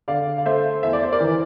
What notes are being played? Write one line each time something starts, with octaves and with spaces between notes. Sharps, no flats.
D3 D5 F5
F5
A3 C5 E5
E2 E5
D5
C5
A#4 D5
E3